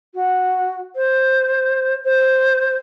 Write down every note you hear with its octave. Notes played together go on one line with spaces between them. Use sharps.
F#4
C5
C5